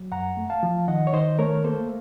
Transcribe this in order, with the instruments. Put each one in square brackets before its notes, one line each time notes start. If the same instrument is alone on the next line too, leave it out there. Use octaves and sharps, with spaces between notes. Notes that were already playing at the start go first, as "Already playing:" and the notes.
Already playing: [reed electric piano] F#3
F#2 F#5 A#5
A3
F5 A5
F3
D#3 D#5 F#5
C#5
D#3 C5 D#5
A3 A#4 C#5
A#3 A4 C5